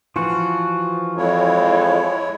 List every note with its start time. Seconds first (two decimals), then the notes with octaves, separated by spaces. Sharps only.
0.16 E3 F3 F4 F#4
1.17 F2 G#3 E4 C#5